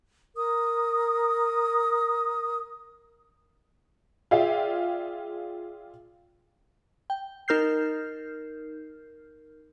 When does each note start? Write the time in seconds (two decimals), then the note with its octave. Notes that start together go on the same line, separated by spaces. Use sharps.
0.35 A#4 D#6
4.31 F4 G#4 D5 E5 F5 G5
7.10 G5
7.48 D#4 A#4 F6 G6 C7